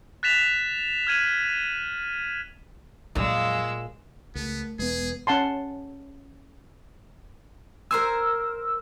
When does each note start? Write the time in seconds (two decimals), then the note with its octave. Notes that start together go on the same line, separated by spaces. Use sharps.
0.23 F#6 A6 B6 E7 F7
1.07 F6 G#6 D#7 F#7
3.15 F2 A#2 F#3 G#3 F4 E6
4.35 C#2 A3 B3 A#4
4.79 E1 G#3 B3 G#4 B4
5.27 C#4 F#5 A5 C6
7.91 A#4 C5 G#5 E6